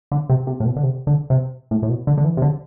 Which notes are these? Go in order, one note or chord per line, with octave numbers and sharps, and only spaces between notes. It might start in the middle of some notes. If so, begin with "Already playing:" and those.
D3
C3
C3
A2
B2
D3
C3
D3
C3
A2
A2
B2
D3
D3
E3
C3
D3